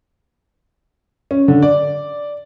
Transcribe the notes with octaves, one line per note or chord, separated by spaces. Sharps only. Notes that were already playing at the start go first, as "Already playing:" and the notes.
C#4
D3
D5